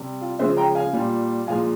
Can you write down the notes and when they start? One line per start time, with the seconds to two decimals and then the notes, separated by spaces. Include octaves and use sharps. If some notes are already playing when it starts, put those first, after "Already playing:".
Already playing: C3 G3
0.21 F4
0.39 C#3 F3 G#3 C5 E5
0.57 G5 A#5
0.75 F5 G#5
0.93 A#2 G3
1.47 A#2 F3 G#3 F5 G#5